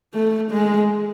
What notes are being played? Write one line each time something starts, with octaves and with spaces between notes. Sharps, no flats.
A3
G#3